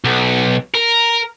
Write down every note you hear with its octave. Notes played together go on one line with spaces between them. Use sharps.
B1
A#4